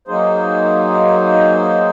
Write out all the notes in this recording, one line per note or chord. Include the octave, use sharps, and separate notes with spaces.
F#3 A#3 D#4 G#4 C5